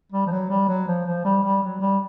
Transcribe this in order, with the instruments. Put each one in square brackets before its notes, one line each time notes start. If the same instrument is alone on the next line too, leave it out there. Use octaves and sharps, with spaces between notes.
[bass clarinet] G3
F3
F#3
G3
F#3
F3
F3
G3
G3
F#3
G3